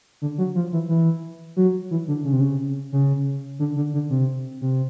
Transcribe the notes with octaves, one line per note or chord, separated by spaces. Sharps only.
D3
F#3
F3
E3
E3
F#3
E3
D3
C#3
C3
C#3
C#3
D3
D3
D3
C3
C3